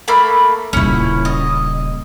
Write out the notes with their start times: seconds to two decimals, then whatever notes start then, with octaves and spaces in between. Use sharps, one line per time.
0.08 A3 A#3 B5
0.73 D#1 C#3 C#4 E4
1.25 D#5